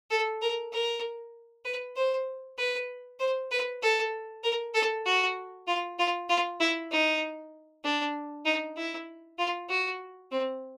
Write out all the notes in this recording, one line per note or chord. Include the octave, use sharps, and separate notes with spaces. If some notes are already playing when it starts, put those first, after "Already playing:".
A4
A#4
A#4
B4
C5
B4
C5
B4
A4
A#4
A4
F#4
F4
F4
F4
E4
D#4
D4
D#4
E4
F4
F#4
C4